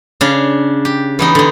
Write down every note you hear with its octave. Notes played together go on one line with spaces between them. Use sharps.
C#3 D4
G4
E3 B3 D#4
D3 D#4